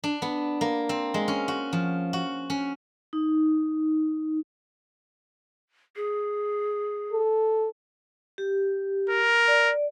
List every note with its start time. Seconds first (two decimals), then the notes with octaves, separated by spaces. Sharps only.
0.04 D4
0.22 B3
0.61 A#3
0.89 C4
1.14 G#3
1.28 C#4
1.48 F#4
1.73 F3
2.13 F#4
2.50 C#4
3.13 D#4
5.96 G#4
7.13 A4
8.38 G4
9.09 A#4
9.48 D5